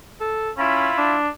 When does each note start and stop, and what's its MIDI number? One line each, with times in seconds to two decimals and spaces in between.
0.21 0.51 69
0.57 0.89 61
0.57 1.15 64
0.57 1.15 65
0.57 1.15 83
0.98 1.29 62